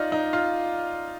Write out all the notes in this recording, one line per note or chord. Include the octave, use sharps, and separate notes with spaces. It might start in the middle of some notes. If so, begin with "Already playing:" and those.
Already playing: D#4 F4 D5
D#4
F4